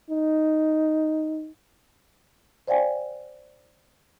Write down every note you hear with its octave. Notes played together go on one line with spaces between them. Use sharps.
D#4
C5 D5 F5 G5 G#5